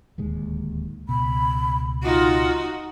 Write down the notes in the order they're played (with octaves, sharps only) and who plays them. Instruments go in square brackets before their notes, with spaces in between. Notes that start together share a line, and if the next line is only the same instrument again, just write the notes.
[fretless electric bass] D1 D#2 G#3
[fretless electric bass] C#2 B2 [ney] B5
[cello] D#4 F#4 [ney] F4